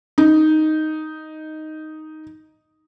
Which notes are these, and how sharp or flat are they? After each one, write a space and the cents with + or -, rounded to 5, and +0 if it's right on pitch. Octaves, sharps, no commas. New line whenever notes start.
D#4 +0